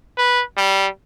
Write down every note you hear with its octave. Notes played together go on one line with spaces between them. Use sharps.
B4
G3